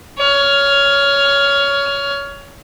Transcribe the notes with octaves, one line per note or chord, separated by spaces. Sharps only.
C#5 F6